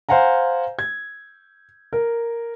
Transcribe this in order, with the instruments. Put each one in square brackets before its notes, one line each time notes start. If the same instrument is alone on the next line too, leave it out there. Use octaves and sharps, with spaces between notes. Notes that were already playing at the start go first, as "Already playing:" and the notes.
[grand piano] C5 F5 F#5 G#5 A#5
G#6
A#4